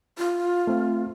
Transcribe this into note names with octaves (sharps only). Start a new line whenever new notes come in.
F4
A3 C4